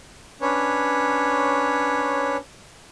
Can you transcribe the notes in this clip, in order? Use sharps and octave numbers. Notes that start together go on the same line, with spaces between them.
C#4 D4 B4 C#5